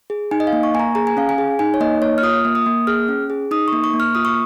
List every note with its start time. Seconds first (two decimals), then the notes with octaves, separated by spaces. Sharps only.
0.10 G#4
0.31 D#4 G#5
0.40 D#5
0.47 F5
0.53 A#3
0.63 C#6
0.74 A#3 G#5
0.79 A#5
0.95 G#4 A#5
1.07 G#5
1.17 C#4 F5
1.29 G#5
1.38 G#4
1.59 D#4 G#5
1.74 C#5
1.80 A#3 D#5
2.02 A#3 C#5
2.18 F6
2.23 F4 D#6
2.45 A#3
2.55 D#6
2.66 A#3
2.87 G#4 F6
3.08 C#4
3.30 G#4
3.51 D#4 D#6
3.68 C#6
3.73 A#3
3.84 C#6
3.94 A#3
4.00 F6
4.15 F4 D#6
4.25 C#6